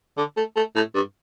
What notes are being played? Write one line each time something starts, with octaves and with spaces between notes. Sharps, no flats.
D3
A3
A3
A2
G2